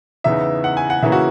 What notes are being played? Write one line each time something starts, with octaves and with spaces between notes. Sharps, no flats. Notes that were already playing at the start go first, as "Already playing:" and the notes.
E2 C#3 E3 B3 D#4 E5
F#5
G#5
F#5
C#3 E3 A#3 C#4 E5
F#4